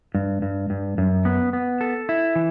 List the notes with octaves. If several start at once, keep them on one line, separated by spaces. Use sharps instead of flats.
G2
G2
G2
F#2
B3
B3
A4
E4
E3